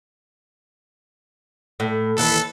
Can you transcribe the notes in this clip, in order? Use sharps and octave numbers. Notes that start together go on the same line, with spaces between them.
A2
D#2 E3 A4